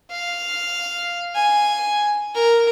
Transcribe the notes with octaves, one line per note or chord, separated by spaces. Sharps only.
F5
G#5
A#4